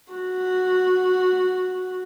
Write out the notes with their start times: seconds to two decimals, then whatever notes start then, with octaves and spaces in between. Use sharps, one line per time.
0.12 F#4